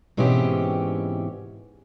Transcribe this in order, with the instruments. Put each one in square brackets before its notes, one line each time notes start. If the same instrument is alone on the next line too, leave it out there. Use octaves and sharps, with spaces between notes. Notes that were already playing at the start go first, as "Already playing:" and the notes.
[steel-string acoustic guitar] G#2 B2 E3 C4 C#4 G4